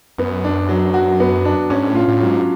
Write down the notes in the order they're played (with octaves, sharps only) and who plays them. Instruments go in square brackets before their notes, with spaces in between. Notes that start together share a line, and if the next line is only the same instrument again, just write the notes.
[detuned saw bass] F#2 [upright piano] B3
[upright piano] D4
F#3
F#4
B3
D4
[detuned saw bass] G#2 [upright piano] C#4
[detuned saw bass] A2
[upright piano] F4
[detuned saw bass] A2
[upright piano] F#3
[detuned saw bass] G#2